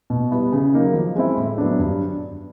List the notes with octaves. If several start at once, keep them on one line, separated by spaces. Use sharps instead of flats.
B2
G3 B3 E4
C#3
F#3 A#3 D#4
F3
G#3 C4 E4
A2
F#3 B3 D4
G2